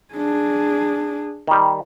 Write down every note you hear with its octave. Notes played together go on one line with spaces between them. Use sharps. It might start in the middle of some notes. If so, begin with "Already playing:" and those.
D4 G#4
D#3 G3